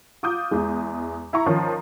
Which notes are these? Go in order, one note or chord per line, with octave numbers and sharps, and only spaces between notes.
F4 D6 D#6 G6
E2 G#3
E4 A#5 C#6
D#3 F3 C#4